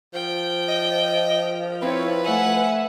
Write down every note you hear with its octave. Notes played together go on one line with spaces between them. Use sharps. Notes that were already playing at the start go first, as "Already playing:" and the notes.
F3 G5
D#5
C4 E4 B4 C#5
A3 E5 F#5 G#5